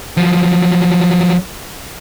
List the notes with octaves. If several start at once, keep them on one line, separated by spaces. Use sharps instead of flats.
F3 F#3